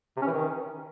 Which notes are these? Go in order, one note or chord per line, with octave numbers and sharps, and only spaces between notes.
C3
C#4
E3
D#3